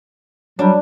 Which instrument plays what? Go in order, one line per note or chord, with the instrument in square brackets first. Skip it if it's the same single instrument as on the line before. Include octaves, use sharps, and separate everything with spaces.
[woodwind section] F#3 G3 [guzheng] D4